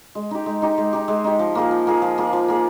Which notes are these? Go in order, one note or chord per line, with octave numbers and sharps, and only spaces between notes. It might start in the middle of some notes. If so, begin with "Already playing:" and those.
G#3
D#4 G4
G#3
D#4 G4
G#3
D#4 G4
G#3
D#4 G4
F3
A#3 F4 G#4
F3
A#3 F4 G#4
F3
A#3 F4 G#4
F3
A#3 F4 G#4